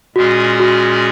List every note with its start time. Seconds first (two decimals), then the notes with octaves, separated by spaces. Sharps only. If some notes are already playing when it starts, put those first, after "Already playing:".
0.16 A#2 G#3 C#4 F#4 G#4
0.60 F#4